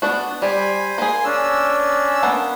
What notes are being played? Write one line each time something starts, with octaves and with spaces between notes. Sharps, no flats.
B3 D4 F#4
G3 C5 D5 G#5 B5
A#3 G#4 G#5 C6
C#4 D4 E6
A#3 B3 A5